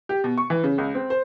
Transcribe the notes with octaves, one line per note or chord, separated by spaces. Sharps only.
G4
B2
C#6
E3
C#3
C#2
C4
C5